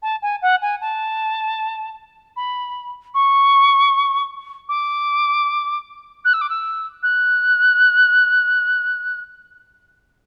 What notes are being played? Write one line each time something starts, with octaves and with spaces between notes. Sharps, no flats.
A5
G#5
F#5
G#5
A5
B5
C#6
D6
F#6
E6
D6
E6
F#6